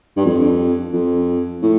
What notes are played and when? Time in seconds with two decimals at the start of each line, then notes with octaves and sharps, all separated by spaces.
0.17 G2
0.25 F2
0.93 F2
1.62 A2